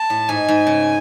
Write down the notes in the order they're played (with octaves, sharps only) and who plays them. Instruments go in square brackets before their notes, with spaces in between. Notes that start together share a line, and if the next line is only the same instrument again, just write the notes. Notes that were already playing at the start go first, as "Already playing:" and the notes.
Already playing: [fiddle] A5
[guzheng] A2
[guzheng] G#2 [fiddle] G#5
[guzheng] G#2
C#3